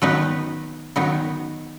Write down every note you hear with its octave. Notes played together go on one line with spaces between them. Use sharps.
D#3 F#3 B3 D#4 B4
D#3 F#3 B3 D#4